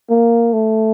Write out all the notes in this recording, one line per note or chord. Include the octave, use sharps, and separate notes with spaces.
A#3
A3